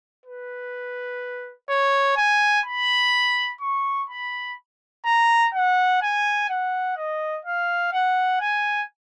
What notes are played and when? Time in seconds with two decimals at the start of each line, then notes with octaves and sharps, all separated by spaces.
0.26 B4
1.69 C#5
2.17 G#5
2.65 B5
3.61 C#6
4.10 B5
5.05 A#5
5.54 F#5
6.02 G#5
6.49 F#5
6.97 D#5
7.45 F5
7.93 F#5
8.40 G#5